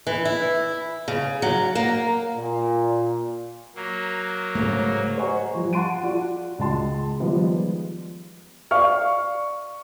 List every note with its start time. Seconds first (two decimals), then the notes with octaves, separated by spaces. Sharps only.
0.07 E3
0.25 E4
1.08 C#3
1.42 F#3
1.75 A#3
2.36 A#2
3.75 F#3 A#3
4.55 G#2 C#3 A3 C#4
5.18 C5 D#5 F#5 G#5 A#5 C#6
5.54 F3 G3
5.73 F#5 A5 C6 C#6 D7 D#7
6.03 F4 F#4 D5 F#5
6.59 C#2 G#3 F#4 A5 C6
7.20 D#3 F3 G3 G#3 B3
8.71 D5 F5 C#6 F6